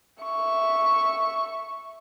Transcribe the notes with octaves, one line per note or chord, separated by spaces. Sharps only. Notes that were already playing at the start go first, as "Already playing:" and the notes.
E5 C#6